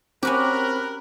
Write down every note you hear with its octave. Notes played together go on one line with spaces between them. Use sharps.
C4 C#4 F#4 G4 A#4 B5 F#6